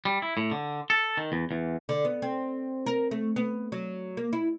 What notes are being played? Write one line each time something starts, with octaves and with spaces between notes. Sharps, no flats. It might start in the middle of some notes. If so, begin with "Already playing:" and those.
G3
E4
A2
D3
A4
D#3
E2
E2
D3
B3
C4
A#4
A3
B3
F#3
A#3
E4